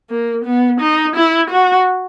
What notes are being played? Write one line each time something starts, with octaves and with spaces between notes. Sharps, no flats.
A#3
B3
D#4
E4
F#4